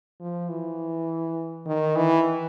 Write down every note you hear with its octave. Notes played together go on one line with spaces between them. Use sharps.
F3
E3
D#3
E3